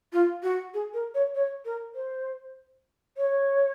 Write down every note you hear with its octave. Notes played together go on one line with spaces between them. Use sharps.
F4
F#4
G#4
A#4
C#5
C#5
A#4
C5
C#5